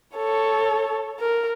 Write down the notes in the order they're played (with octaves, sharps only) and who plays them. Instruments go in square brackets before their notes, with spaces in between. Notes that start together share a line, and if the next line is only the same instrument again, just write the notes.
[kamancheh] A4 C#5
A#4